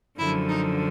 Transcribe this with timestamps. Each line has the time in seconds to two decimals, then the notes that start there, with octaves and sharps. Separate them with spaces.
0.19 F#2 D3 F3 E4
0.49 D#4